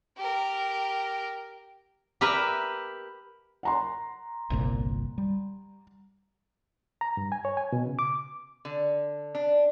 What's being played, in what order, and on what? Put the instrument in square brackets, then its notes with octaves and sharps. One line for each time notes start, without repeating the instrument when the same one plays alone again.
[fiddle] G4 A#4
[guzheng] G4 A#4 B4 E5
[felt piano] F#5 A#5 C6
[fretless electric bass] G1 C2 A#2
G3
[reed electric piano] A#5
G2
G#5
C#5
G#5
B2
C#3
D6
[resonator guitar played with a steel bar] D3
D4